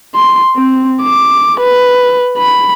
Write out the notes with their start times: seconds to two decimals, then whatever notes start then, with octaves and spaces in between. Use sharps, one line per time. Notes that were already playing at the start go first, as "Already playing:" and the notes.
0.15 C6
0.57 C4
1.02 D6
1.60 B4
2.38 B5